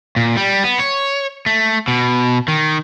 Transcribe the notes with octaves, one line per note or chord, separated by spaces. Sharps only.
A#2
G3
B3
C#5
A3
B2
D#3